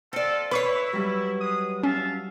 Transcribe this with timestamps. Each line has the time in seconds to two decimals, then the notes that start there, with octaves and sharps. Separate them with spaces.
0.13 C4 F4 A4 D5
0.51 E4 B4 C#5 B5 C#6 C7
0.93 F#3 G3
1.40 G#3 D#6
1.83 C#4 E5 F5 A5